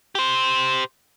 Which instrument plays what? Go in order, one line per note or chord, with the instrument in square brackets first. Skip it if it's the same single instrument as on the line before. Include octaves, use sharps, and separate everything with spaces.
[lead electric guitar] G4 C5